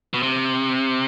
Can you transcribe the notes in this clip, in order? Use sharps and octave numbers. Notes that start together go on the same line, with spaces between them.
B2
C3